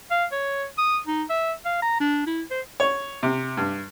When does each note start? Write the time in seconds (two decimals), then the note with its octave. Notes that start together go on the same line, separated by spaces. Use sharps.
0.11 F5
0.32 C#5
0.78 D#6
1.07 D#4
1.30 E5
1.65 F5
1.82 A#5
2.00 D4
2.27 E4
2.51 C5
2.80 C#5
3.23 C3
3.57 G2